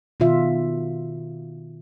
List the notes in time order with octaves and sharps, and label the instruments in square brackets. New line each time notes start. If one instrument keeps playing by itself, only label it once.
[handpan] B2 D#3 F4 E5